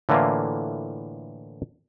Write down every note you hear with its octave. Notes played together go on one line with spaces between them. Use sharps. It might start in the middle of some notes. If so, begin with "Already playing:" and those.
A2 D3 E3 A#3 F4